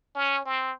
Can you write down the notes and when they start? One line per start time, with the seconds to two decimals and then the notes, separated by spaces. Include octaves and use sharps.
0.15 C#4
0.45 C4